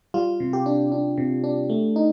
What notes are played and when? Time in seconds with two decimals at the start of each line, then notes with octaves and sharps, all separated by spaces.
0.14 G3 F4
0.40 C3
0.53 G4
0.66 D4
0.92 D4
1.18 C3
1.44 D4
1.70 A3
1.96 D#4